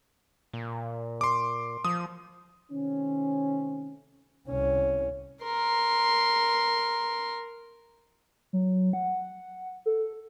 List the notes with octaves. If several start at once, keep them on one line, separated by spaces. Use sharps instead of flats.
A#2
C6 D6
F3 D#6
C3 D#3 A3 C4 C#4
C2 C#4
A#4 C6
F#3
F#5
A4